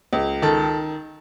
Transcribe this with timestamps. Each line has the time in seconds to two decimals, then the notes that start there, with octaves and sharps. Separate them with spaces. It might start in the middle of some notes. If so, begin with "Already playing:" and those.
0.13 C#2
0.42 D#3 A4